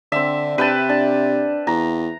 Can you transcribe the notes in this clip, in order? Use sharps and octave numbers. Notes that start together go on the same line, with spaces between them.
D3 C4 D4 E5
C3 B4 G5 A5
D4 A5
E2 A#5